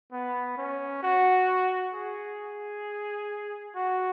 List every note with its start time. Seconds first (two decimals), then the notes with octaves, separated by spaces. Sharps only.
0.12 B3
0.57 C#4
1.03 F#4
1.94 G#4
3.75 F#4